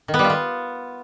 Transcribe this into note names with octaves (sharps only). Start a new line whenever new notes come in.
D#3
B3
G3
F4
B3